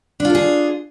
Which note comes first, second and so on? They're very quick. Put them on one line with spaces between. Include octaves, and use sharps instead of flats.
D4 F4 A4 G#4